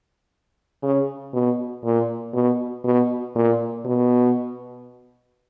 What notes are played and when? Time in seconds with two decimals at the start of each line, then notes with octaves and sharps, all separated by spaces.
0.82 C#3
1.34 B2
1.84 A#2
2.33 B2
2.84 B2
3.35 A#2
3.85 B2